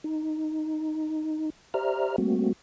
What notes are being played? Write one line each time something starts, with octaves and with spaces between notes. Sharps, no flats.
D#4
G4 C5 D5 E5 A#5 F6
G3 A3 A#3 C4 F#4